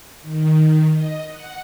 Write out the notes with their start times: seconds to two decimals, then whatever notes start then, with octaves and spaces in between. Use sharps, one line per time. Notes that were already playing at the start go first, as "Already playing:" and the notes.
0.22 D#3
0.91 D#5
1.28 F#5